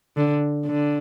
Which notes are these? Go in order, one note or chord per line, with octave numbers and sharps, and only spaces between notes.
D3
D3